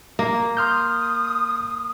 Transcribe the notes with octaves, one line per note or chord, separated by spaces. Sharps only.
A#3
C6 D#6 F6 G6